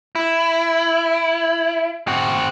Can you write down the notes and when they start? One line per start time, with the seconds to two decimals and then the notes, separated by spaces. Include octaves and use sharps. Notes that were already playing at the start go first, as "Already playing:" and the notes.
0.15 E4
2.07 C4 F#4